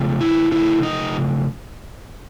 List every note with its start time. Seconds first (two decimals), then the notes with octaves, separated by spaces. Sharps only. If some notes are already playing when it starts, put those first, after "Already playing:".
Already playing: C#3 F3 A3
0.21 E4
0.52 C#3 F3 A3 E4
0.83 D#4